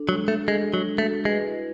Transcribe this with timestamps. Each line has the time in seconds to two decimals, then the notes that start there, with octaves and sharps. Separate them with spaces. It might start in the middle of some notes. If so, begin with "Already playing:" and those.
Already playing: D4 A4
0.09 F#3 G#3
0.28 A3 F#4
0.48 G#3 A4
0.67 D4
0.74 F#3
0.86 G#3
0.98 A3
1.05 F#4
1.25 G#3 B4
1.45 E4